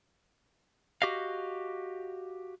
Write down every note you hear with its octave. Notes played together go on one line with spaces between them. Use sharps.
F#4 G4 D#5 F5